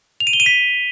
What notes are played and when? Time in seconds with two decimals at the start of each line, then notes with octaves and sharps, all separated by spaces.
0.20 F7
0.27 D#7
0.33 G7
0.40 D#7
0.46 B6